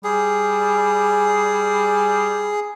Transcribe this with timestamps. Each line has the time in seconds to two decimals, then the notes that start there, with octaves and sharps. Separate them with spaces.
0.04 G3 G#4